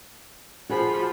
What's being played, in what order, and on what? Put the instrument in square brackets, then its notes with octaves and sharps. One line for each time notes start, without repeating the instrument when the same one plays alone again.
[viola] F3 B5 [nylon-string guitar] F#4 G#4 C5